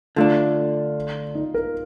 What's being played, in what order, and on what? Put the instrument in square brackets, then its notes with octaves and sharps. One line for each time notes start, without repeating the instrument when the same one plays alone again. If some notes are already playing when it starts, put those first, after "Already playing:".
[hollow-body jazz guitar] D3 A3 D4 [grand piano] F4
[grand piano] D#4
A#4